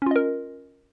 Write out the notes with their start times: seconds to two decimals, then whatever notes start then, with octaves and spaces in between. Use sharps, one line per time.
0.02 C#4
0.06 F4
0.11 D#5
0.16 A#4